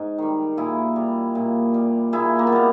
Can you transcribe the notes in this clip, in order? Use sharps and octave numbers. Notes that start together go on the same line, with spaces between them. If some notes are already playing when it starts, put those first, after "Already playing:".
Already playing: G#2
D#3 G3
A#2 E4 G#4
G3
A#2
G3
A#2 E4 G#4
A#3
B3
G3 A#3